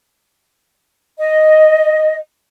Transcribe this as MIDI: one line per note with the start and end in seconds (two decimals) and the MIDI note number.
1.19 2.16 75